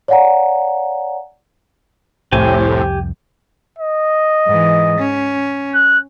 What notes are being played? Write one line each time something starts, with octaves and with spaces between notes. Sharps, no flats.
C#5 D5 F5 F#5 G#5 A#5
C2 F2 A2 C4 G4 G#5
D#5
G#2 E3
C#4
F#6